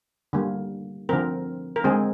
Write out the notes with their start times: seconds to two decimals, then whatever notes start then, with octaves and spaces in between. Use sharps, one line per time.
0.33 D3 G3 A#3
1.09 D3 F3 C4 A#4
1.76 A#4
1.84 D3 G#3 C4 G#4